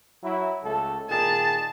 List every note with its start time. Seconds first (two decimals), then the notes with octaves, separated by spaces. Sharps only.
0.24 F#3 E4
0.63 C#2 A3 A4
1.10 A#2 D#3 G#4 A5